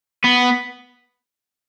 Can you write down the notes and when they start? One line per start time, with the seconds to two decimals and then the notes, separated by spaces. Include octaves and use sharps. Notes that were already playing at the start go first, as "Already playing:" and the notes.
0.24 B3